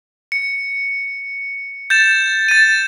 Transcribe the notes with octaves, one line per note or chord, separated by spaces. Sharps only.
C#7
G6 A6 E7
A6 D#7